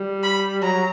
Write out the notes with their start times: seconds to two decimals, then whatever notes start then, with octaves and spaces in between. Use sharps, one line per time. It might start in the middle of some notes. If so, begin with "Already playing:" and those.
Already playing: G3
0.23 B5
0.62 F#3 A#5